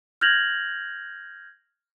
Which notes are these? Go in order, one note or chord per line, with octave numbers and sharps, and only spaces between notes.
F6 G6 G#6 A#6 F7 F#7